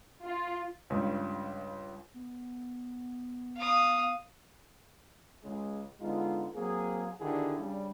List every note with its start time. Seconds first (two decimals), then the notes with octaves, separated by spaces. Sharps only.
0.24 F4
0.90 C#2 G2
2.14 B3
3.57 F5 D#6
5.44 C#2 C#3 G#3
6.00 D3 G#3 B3 D#4 F4
6.55 F#3 A#3 C4 G#4
7.21 D3 D#3 D4 E4 G4 G#4
7.58 C#3 G3 D4